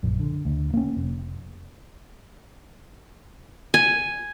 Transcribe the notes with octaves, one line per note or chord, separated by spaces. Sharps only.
A#1 F#2
D3
D2
A#3 B3 C#4
F1
G#5